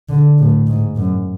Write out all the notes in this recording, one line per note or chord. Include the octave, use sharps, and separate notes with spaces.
D3
A2
G#2
F#2